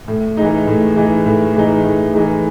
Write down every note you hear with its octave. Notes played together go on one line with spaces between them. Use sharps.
A2
E3 G#3 D#4
A2
E3 G#3 D#4
A2
E3 G#3 D#4
A2
E3 G#3 D#4